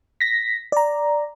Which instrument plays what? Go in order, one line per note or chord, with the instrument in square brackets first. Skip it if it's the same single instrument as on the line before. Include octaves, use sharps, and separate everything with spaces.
[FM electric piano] A#6 B6
D5 A#5